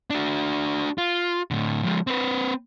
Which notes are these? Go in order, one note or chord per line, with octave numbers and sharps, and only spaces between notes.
D4 F#4
F4
A2 D3
F3 G#3
C4 B4